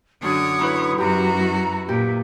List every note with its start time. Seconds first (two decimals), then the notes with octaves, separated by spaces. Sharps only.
0.22 F#2 D3 D4 C#5 D#6
0.59 D#4 E4 B4
0.98 F#2 F#4 G4 A#5
1.39 E4
1.89 A#2 G4